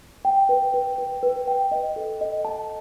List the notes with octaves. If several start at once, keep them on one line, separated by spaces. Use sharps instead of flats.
G5
B4
B4
B4
B4
G5
D#5
A4
D#5
A5